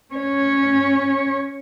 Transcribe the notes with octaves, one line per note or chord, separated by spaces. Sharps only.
C#4 C#5